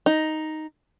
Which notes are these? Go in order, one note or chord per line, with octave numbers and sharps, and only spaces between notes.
D#4